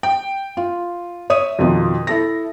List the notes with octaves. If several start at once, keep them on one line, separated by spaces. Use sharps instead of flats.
G5
F4
C#5 E5 D#6 D#7
F2 B2 D#3 F3
E4 A4 A#6